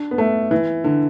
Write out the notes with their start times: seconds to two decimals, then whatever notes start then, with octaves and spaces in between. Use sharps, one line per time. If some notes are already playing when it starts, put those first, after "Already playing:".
Already playing: D4
0.11 B3
0.18 A3
0.51 E3
0.84 D3